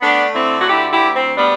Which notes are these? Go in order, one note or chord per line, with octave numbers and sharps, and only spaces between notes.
A3 B3 D4
D3 C4 E4
F#4
D2 E4 G4
E4 G4
D2
C4
G3 B3 D4